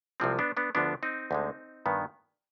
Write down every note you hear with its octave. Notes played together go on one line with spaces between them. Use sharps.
C2 C3 F3 G#3 C4
B3 D4
B3 D4
D2 D3 F3 B3 D4
C4 D#4
D2 D3 G#3
G2 D#3 B3